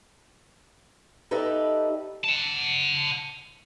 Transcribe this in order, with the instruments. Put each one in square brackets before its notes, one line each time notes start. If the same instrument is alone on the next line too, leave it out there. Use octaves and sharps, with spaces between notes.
[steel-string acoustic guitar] D#4 G4 A4 B4 D5 E5
[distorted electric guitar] F#5 A5